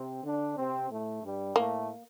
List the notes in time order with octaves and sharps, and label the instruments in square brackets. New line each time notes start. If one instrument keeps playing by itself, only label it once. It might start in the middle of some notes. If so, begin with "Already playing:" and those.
Already playing: [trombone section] C3 C4
D3 D4
C3 C4
A2 A3
G2 G3
[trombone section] A2 A3 [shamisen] A#3